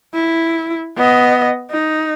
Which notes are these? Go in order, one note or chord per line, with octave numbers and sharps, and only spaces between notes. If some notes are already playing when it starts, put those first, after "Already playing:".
E4
B3 D#5
D#4